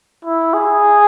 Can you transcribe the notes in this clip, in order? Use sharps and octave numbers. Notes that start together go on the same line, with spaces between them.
E4
G#4